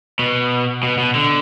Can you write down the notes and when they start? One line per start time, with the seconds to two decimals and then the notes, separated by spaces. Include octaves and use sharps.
0.19 B2
0.83 B2
0.98 B2
1.15 D3